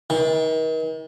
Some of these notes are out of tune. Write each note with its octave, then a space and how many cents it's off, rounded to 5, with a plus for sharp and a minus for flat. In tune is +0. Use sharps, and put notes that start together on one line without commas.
D#3 +40